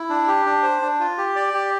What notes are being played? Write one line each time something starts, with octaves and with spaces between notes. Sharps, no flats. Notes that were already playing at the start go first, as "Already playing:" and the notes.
Already playing: E4
D4
G4
D4
C5
D4
F4
G4
D5
G4